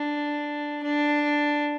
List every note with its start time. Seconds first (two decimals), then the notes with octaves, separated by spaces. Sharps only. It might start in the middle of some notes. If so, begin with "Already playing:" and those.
Already playing: D4
0.83 D4